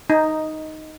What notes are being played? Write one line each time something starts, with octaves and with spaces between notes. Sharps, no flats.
D#4